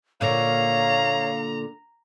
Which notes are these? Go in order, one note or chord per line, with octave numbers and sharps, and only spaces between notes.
A#2 D3 A#3 C#5 F5 A#5